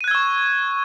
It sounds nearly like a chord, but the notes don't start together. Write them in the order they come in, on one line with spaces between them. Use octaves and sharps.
D#7 F#6 G#6 E6 C#6